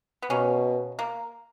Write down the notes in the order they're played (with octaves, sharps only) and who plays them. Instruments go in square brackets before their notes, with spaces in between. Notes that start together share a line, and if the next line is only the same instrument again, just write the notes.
[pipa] B3
[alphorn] B2 [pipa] A#3 C#4
[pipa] A#3